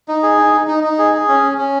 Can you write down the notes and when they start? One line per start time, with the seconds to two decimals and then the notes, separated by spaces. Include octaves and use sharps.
0.08 D#4
0.23 G#4
0.38 D#4
0.53 D#4
0.67 D#4
0.84 D#4
0.98 G#4
1.14 G#4
1.28 C#4
1.43 C#4
1.58 C#4